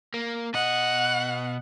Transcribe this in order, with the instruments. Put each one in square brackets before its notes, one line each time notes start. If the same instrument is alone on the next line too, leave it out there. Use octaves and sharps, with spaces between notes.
[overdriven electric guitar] A#3
[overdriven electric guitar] B2 D#5 [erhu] F#5